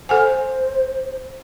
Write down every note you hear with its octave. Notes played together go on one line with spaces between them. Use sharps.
A4 C5 F#5 G#5